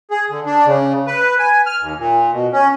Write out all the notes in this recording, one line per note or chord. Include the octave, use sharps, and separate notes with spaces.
G#4
D3
D4
C#3
B4
G#5
F6
D#2
A#2
B2
C#4